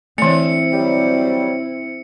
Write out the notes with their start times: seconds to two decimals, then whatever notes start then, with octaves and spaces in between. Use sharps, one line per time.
0.18 D3 E3 A3 C4 E4 C#7
0.73 F#3 G3